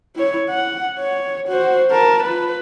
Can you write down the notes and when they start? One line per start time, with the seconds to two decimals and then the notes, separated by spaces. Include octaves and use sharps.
0.16 E4 C#5
0.49 F#5
1.00 C#5
1.49 F#4 C5
1.91 A#4 A5
2.24 F4 B4